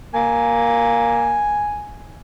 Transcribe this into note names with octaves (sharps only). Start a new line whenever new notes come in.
A#3 G#5